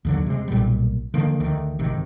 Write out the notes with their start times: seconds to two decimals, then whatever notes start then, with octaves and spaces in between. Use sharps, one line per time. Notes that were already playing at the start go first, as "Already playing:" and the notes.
0.05 D#2 D3 F#3
0.26 C3 G#3
0.48 B1 A#2 G3
1.14 D3 D#3 F3 A#3
1.40 D2 D#3
1.79 G#1 C3 D#3